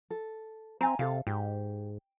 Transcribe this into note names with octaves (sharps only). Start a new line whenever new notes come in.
A4
C4 E5 G#5 A#5
C3 A4 F5
G#2 G4